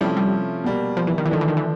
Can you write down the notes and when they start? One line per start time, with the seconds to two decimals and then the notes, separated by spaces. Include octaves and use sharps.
0.01 C3 F3 G3 A3 C#4 E4
0.17 G3
0.64 B2 G3 A#3
0.97 F3
1.07 E3
1.18 D#3
1.26 E3
1.28 D3 D#3 F3 A3 D4
1.41 E3
1.48 D#3
1.57 E3